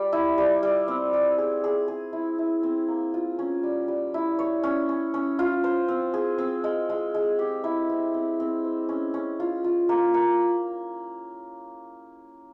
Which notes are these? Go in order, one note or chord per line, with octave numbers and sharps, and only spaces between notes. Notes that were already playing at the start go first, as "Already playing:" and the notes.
Already playing: G3
E4
G3
G3
C4
G3
G#4
G#4
G#4
E4
E4
C4
A#3
F4
C#4
G3
G3
E4
C#5
C#4
C#4
C#4
F4
C5
C4
G#4
C4
G#3
G#3
G#3
G4
E4
C4
C4
C4
C5
C#4
C#4
F4
F4
A#3
A#3